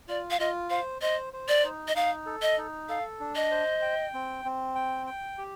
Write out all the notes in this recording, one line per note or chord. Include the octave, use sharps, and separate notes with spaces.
F4 D5
F5
F4 D#5
C5 F5
C5 D#5
C5
D5
D#4
D#5
D#4 F5
A4
D#5
D#4
A4 F5
D4
D#5
C5
G5
C4
C4
G5
G5
G4